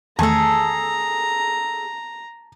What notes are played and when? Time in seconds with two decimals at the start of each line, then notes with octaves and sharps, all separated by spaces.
0.19 E2 D#3 A3 G#4 A4 A5 A#5